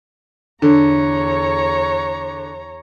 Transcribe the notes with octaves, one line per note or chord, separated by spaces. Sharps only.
E2 D3 C#5 A#5